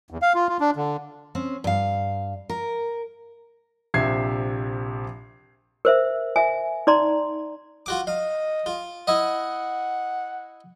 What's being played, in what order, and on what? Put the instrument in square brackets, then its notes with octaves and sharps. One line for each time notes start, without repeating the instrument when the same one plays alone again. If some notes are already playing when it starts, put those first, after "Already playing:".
[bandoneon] E2
F5
F4
F4
D4
D3
[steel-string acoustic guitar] C4 C#4
G2 F5
A#4
[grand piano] A#1 C3 E5 G#6 C7
[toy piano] A#4 C5 E5
E5 G#5
D#4 D5 A#5 C6
[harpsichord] F4 F#4 D6
[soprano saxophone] D#5 [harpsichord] F5
[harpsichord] F4
[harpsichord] E4 D#5 [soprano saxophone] F#5